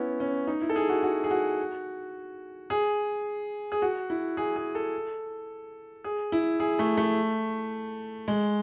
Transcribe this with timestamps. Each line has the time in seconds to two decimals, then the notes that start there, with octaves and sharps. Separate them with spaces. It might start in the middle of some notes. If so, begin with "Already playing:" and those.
Already playing: B3 C#4 E4
0.20 C#4
0.47 D#4
0.61 E4
0.69 A4
0.76 G#4
0.89 F#4
1.03 F#4
1.24 G#4
1.31 F#4
2.70 G#4
3.72 G#4
3.82 F#4
4.10 E4
4.37 G#4
4.56 G#4
4.75 A4
6.04 G#4
6.32 E4
6.60 G#4
6.79 A3
6.97 A3
8.28 G#3